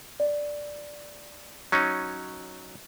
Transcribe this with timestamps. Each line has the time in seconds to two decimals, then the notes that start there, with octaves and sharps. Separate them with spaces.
0.20 D5
1.72 F#3 C#4 D#4